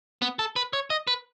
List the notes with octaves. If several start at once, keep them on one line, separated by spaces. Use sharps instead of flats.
B3
A4
B4
C#5
D#5
B4